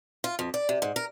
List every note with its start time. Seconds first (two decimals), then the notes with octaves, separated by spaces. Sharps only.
0.24 F4
0.39 F2
0.54 D5
0.69 C3
0.82 G#2
0.96 A#4